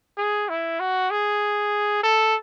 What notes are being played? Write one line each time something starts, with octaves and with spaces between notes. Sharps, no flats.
G#4
E4
F#4
G#4
A4